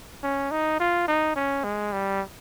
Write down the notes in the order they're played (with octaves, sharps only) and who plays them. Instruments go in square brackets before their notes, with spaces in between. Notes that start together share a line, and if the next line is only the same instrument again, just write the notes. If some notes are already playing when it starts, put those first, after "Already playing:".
[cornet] C#4
D#4
F4
D#4
C#4
G#3
G3